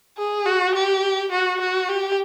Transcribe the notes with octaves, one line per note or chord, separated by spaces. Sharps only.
G#4
F#4
G4
F#4
F#4
G4